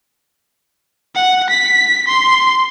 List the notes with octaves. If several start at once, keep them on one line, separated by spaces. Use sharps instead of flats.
F#5
B6
C6